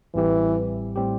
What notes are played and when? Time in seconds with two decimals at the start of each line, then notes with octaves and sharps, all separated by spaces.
0.14 A1 A2 E3 G3 C4 G4
0.96 A2 G3 C4 G4